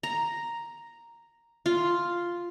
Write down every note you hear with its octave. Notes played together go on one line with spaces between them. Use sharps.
A#5
F4